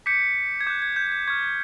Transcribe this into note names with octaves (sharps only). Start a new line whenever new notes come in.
D6 G6 B6 C#7
G#6
D6 F#6 G6
G#6
G6
G6
G#6
C#6 F6 G#6